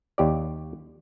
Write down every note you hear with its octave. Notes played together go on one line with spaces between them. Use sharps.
D#2 G4 D5